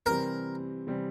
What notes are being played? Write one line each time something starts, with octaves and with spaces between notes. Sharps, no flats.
C3 E3 G3 C4 A#4
C3 E3 G3 C4